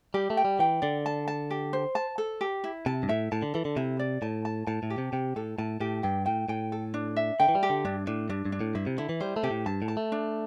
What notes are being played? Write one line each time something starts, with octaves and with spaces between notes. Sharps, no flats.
G3 G4
A3
G5
G3
E3 G5
D3 D5
A5
A5
G4
C5
A5
A4
G4
E4
C3 A5
G2
A2 E5
A2 A5
D3
E3 A4
D3
C3 E4
D5
A2 A5
A5
A2 A5
A2
G4
C3
C3 G5
A2 A4
A2 A5
A2 G4
G2 G5
A2 G5
A2 G5
A4
D4
E5
D3 G5
E3
G3
G4
D3
G2 D4
A2 D4
G2 D4
G2
D4
A2
G2 E4
C3
D3 E4
E3
G3 C5
A3
C3 G4
A2
G2 A5
A2
A5
A3
D4